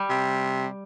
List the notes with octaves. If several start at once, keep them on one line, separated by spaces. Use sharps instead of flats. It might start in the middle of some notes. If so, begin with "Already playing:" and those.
Already playing: G3
C3